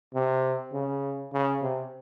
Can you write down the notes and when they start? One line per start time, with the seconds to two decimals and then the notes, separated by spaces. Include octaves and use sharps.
0.14 C3
0.73 C#3
1.34 C#3
1.62 C3